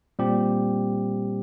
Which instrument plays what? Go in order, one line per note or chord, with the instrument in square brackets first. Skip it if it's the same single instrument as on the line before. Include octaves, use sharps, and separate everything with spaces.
[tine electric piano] A#2 G3 C4 G4